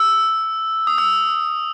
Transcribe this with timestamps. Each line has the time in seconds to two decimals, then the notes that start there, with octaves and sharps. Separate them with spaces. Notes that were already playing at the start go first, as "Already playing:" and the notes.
Already playing: E6
0.87 D#6
0.98 E6